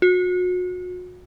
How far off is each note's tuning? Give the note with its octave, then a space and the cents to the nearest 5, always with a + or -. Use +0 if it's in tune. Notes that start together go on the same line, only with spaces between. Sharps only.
F#4 -35